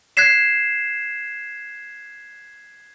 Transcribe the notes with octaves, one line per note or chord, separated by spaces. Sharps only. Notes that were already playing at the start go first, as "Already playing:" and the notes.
F#6 G#6 B6 C7 E7